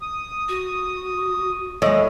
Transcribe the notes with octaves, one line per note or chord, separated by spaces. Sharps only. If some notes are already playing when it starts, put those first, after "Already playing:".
D#6
F#4
A2 G#3 D#5